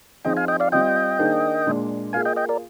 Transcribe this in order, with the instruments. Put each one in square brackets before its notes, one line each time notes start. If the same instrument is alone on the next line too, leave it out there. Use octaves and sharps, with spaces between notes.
[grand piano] F3 C4 D#4 G#4 [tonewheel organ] D#5 G5
[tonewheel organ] F5 G#5
D#5 G5
D5 F5
[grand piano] G3 C4 F4 [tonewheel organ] D#5 G5
[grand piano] D#3 A#3 D4 G#4 C5
A#2 G#3 D4
[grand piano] A#3 F4 G#4 [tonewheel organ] F5 G#5
[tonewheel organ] D#5 G5
D#5 G5
A#4 D5